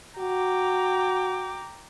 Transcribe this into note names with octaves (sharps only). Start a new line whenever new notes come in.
F#4 G5 A#5 D6